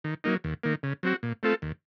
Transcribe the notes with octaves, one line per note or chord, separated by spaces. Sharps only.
D#3
F#3 A#3 D#4
D#2
D#3 A#3
C#3
F#3 C4 F#4
A#2
A3 C4 F4 A4
D#2